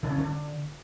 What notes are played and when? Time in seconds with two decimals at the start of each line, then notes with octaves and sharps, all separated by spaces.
0.03 C#3
0.10 C#4
0.18 D3